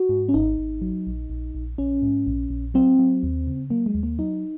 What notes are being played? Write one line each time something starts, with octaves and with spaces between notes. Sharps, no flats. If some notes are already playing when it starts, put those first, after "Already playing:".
Already playing: F#4
G#2
C#4
G#1 D#4
G#1
F#3
A#1
A#1
A#1
A#1 C#4
G#2
A#1
A#1
F#3 C4
F#3
D#2
C#3
F#3 A#3
G#3
D#2
A#3
F#3 D#4